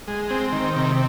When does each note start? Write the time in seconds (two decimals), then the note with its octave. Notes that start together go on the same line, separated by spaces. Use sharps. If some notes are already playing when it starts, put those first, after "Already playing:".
0.08 G#3
0.30 C4
0.52 D#3
0.76 C3